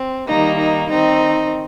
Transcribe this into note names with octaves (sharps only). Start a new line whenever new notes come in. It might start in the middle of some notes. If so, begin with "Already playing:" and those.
Already playing: C4
D#3 G3 A#3 D#4
D#4
D#3 C4 D#4